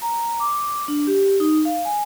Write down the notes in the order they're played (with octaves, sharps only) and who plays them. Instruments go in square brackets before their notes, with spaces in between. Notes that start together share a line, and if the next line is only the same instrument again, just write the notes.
[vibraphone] A#5
D6
D4
G4
D#4
F5
G#5